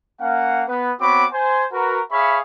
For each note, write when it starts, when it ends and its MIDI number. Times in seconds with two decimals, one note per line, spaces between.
0.20 0.63 58
0.20 0.63 61
0.20 0.63 77
0.20 0.63 78
0.68 0.91 59
0.68 0.91 71
1.01 1.25 59
1.01 1.25 60
1.01 1.25 66
1.01 1.25 73
1.01 1.25 83
1.01 1.25 86
1.32 1.64 72
1.32 1.64 80
1.72 1.99 66
1.72 1.99 70
1.72 1.99 71
2.11 2.38 68
2.11 2.38 73
2.11 2.38 76
2.11 2.38 77
2.11 2.38 83
2.11 2.38 85